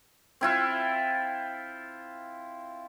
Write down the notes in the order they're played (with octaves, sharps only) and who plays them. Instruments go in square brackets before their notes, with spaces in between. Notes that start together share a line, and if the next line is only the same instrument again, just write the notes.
[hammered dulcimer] C4 E4 F4